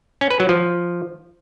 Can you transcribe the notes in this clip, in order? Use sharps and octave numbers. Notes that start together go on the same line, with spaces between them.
C#4
B4
F#3
F3